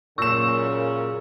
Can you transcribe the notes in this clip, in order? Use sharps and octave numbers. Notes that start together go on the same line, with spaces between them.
F#2 A#2 C#3 C#6 E6 E7